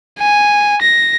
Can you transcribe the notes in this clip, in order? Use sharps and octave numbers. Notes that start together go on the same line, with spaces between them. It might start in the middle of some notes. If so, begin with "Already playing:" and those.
G#5
A#6